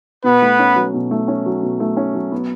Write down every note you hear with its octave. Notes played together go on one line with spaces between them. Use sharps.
B2 B3 B4
A3
C#4
F#3
B2
A3
C#4
F#3
B2
A3
C#4
F#3
B3